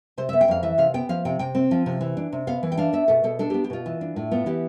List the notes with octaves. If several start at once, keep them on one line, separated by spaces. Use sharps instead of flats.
C3 C5
B3 E5
G5
F2 F5
E3 E5
C3 F5
B3 G5
F3 F5
C3 G5
C3 G5
C4
F3
C3
E3
D4
C3
B3 F5
E3
G5
D4 F5
B3 E5
B2 A4
B2 A4
D4 A4
B3 G4
G4
B2 F4
E3
D4
A2
B3 F4
E3 G4